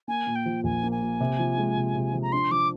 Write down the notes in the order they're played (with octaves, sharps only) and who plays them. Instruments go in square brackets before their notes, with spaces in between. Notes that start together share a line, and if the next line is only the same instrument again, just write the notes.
[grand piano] A#3 [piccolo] G#5
[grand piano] A#2
[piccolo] G5
[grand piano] F3
[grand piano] A#1 [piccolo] G#5
[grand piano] A#3
[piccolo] G#5
[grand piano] A#2
C3
F3
G#3
C3
C3
F3
[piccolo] A#5
[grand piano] D4 [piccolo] C6
[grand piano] F3 [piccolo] D6